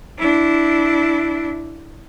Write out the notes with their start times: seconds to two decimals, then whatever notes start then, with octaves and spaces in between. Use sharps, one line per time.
0.18 D4 E4